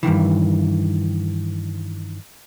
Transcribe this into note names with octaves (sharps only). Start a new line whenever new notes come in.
G2 A#2 D#3 E3